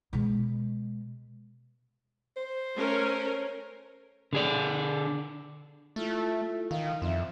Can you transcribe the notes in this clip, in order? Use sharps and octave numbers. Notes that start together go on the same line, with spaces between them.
B2 G#3
C5
A3 C#4 A#4
D3 G#4 D5
A3 E4 F4 A4
D#3 F5
F2 C4 E5